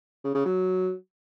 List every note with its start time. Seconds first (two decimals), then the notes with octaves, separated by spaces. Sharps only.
0.24 C#3
0.35 C#3
0.45 F#3